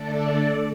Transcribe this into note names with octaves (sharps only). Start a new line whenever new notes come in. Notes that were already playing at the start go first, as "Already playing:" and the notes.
Already playing: D3 A3 D4 A4 D5